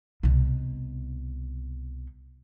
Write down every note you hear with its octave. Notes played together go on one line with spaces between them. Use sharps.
C2 B2